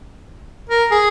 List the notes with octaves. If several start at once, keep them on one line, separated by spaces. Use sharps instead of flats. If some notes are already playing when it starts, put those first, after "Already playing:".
A#4
G#4